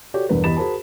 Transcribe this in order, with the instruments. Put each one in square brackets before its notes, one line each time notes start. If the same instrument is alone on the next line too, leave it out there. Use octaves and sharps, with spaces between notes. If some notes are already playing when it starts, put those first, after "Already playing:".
[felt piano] F#4 G4 A4 C#5 D5
E1 E2 G2 A#4 B4
E2 G4 D#5 B5 A6 E7
F#4 G#4 A#4 C5 A5 B5